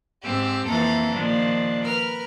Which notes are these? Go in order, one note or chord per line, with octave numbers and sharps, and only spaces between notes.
G#2 C4 G4 E6
F2 E3 F3 A#3 A4 A#5
A#2 D#3 F3 D4
A#4 B4 F6